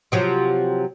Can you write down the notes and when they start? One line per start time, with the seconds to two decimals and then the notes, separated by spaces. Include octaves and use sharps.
0.12 C3 F3 F#3